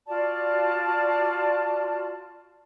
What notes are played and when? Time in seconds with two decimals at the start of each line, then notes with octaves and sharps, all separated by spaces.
0.06 F4 F#4 D5 A5